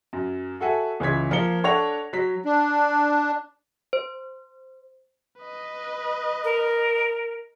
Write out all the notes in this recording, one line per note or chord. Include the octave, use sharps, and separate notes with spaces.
F#2
F#4 A4 E5 F#5 G#5
C#2 E3 C#4 G#6 B6
F3 A#3 F4 A#4 C#7 G7
D4 A4 C#5 F#5 A#6 F7
F#3 B6
D4
C5
B4 D#5
A#4